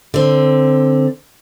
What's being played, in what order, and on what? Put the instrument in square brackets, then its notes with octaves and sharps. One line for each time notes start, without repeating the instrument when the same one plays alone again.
[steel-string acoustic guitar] D3 C4